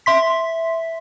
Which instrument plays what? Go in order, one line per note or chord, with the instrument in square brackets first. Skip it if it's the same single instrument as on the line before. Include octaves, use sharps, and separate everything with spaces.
[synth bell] E5 C6 B6